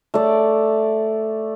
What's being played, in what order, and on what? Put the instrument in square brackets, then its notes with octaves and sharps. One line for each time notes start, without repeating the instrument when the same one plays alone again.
[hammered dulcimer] A3 D5